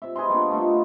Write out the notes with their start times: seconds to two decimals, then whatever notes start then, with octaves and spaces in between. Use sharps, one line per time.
0.02 C3 E5
0.16 G#4 B4 D#5 C6
0.29 G3 A#3 B3 D4
0.51 A3 D#4 F4